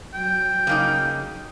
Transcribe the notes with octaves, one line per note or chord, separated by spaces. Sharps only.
F#3 G5
C#3 A#3 D#4